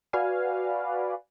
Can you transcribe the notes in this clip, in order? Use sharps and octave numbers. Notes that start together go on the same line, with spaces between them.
F#4 B4 D5 F5 G#5